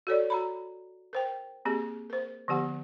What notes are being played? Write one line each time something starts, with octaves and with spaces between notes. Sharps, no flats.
F#4 A4 C#5 D5
F#4 A#5 B5
A#4 C5 G5
A#3 C4 G4 G#4
A#4 C5
D3 F3 B3 G4 F#5